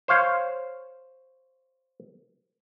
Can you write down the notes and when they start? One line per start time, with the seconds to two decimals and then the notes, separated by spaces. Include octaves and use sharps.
0.08 C5 C#5 F5